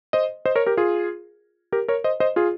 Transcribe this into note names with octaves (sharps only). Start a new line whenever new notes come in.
C5 D#5
C5 D#5
A#4 C#5
G4 A#4
F4 G#4
G4 A#4
A#4 C#5
C5 D#5
C5 D#5
F4 G#4